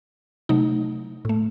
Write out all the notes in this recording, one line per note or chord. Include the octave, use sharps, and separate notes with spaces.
C3 F#3 A3 D#4
A2 A3